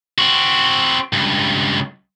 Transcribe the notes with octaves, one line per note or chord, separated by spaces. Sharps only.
C4 F#4
C#2 G2